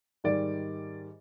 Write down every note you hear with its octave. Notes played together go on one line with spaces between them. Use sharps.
G#2 D#3 G3 D5